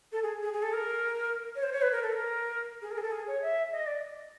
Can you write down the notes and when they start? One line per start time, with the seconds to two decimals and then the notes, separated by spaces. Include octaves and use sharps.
0.12 A4
0.23 G#4
0.43 G#4
0.53 G#4
0.63 A4
0.73 A#4
1.56 C#5
1.63 C5
1.73 C#5
1.82 B4
1.92 A#4
2.03 A4
2.12 A#4
2.82 G#4
2.91 A#4
2.98 G#4
3.03 A4
3.12 G#4
3.27 C#5
3.42 E5
3.72 D#5
3.86 D5